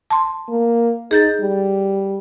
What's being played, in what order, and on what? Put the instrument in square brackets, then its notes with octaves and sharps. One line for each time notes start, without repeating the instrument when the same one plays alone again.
[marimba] A5 C6
[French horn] A#3
[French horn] D#4 [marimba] G#4 G6 A6
[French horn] G3